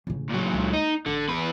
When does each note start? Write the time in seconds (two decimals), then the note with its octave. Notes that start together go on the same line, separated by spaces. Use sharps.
0.07 A1 C#3
0.29 A#2 F#3
0.53 C#2
0.73 A#3 D#4
1.06 A1 D3
1.28 E2 B4